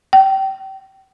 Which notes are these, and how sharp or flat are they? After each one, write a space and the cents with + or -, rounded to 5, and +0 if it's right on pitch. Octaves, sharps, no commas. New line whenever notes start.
G5 -25